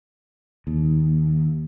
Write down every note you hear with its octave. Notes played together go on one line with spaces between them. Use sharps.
D#2